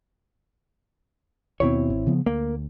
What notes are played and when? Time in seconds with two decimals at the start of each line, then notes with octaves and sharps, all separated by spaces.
1.60 D#2 B2 C4 E4 C#5
1.90 G#1
2.07 C#3 F3 B3
2.26 D2 A#3